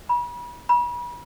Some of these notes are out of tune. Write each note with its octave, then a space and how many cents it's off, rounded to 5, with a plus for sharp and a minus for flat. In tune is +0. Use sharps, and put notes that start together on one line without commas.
B5 -35
B5 -35